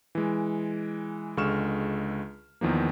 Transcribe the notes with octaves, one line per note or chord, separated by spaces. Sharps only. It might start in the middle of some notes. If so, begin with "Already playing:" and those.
E3 G#3
C#2 D3 G#3 C#6 F6 E7
E2 D#3 F3 A#3